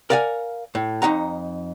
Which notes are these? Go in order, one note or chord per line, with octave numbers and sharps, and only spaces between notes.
A#4 D5 F5 F#5 G#5
A2
F2 D#4 F#5 A#5